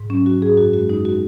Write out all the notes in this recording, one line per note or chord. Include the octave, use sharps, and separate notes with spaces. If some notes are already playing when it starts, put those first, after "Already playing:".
Already playing: G#2
F#3 C#4
F#3 F#4
G#2 G#4
F#2 F#4
G#3 F#4
G#3 D#4
F#4